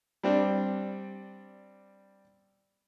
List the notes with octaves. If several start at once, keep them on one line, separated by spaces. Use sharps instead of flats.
G3 C4 D4